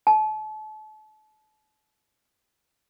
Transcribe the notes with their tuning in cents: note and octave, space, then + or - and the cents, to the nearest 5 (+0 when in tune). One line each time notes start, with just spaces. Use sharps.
A5 -35